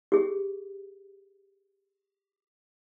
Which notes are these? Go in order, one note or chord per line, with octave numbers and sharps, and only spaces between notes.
G4 G#4